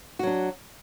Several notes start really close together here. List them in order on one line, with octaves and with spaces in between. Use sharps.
F#4 F#3 D4